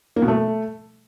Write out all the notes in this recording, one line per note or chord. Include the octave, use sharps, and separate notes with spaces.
A#3
B2
A3